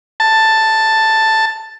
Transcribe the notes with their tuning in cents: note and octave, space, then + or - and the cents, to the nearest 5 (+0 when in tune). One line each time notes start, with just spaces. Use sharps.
A5 +5